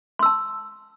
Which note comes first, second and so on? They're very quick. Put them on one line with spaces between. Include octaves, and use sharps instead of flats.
C6 E6 A5